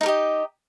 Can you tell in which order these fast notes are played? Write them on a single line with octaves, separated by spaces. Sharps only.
D#4 A#4 G4 D#5